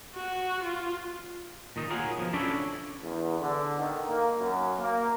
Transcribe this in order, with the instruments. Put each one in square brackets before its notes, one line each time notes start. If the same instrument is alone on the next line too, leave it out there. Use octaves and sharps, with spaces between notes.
[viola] F#4
F4
[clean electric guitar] A#2 D#3 D#4
F4 F#4 G#4 A#4 C#5
B2 F3
C#4 D4 E4 A4 C#5 D5
[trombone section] E2
D3
D#3
A#3
F#2
A#3